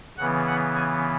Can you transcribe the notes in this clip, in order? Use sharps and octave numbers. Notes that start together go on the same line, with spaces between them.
C#3 E3 B3 F#5
F#5
G#5